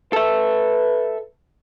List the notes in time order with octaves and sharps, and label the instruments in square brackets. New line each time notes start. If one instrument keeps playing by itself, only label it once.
[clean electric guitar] A4 E5 [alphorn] B4